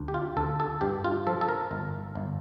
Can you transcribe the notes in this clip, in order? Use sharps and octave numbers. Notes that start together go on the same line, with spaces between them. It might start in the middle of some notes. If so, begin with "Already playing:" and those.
Already playing: D2
G4
F4
D2 A4
A4
G2 G4
F4
F3 A4
A4
A#4
G1
G1